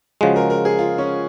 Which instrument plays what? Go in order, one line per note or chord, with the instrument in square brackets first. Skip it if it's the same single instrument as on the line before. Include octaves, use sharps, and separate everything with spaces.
[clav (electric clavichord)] C#3 F3 G#3 [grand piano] F#4
[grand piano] A#4
A#4
G#4
F4
C#4